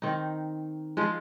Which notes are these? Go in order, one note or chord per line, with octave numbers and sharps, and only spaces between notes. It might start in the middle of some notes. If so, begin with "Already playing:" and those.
D#3 C4 D#4
F3 G#3 F4